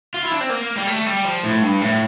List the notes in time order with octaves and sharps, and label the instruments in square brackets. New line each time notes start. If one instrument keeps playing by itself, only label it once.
[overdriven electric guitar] F4
E4
D4
C4
A#3
G3
A3
G3
F3
A2
G2
A2